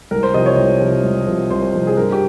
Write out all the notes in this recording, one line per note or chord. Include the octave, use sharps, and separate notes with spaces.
C2 A#4
C5
C3 F3 D#5
C#5
C2
C3 F3
C2
C3 F3
C2 C5
C3 F3
G#4
G2 A#4
G4